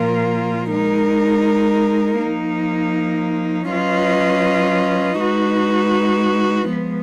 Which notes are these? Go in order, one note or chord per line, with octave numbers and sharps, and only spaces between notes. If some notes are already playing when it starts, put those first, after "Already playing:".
Already playing: A#2 F3 A#3 F4 A#4
G#3 D#4 A#4
F3 A#3 D#4
F#3 C#4 F4 B4 D#5
G#3 D#4 F#4 B4
F3 G#3 B3